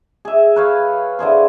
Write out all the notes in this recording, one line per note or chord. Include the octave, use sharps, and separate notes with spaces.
G#4 E5
B4 C#5 F5
D3 E4 G#4 C5